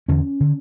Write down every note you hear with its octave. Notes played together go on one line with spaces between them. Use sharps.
E2 D3 C#4
D3